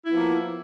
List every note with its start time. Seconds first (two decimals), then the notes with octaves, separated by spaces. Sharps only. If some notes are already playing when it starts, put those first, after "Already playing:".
0.05 E4
0.08 B3
0.12 F3
0.15 A#3